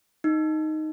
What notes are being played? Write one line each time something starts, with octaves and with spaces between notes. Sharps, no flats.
D#4